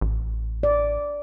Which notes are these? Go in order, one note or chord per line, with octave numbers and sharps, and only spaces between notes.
A1
D5